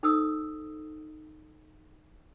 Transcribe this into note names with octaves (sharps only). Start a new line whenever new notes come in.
D#4 A4 C5 D#6 E6